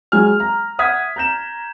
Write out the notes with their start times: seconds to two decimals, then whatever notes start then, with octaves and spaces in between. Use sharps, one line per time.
0.12 F#3 G#3 G#5 F6
0.40 A#5
0.79 E5 F#5 D#6 G#6 B6
1.16 A#5 G6 E7